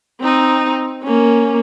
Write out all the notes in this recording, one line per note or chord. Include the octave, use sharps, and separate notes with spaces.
C4 D#4
A#3 C#4